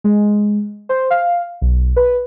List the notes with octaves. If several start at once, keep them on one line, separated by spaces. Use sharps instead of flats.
G#3
C5
F5
B1
B4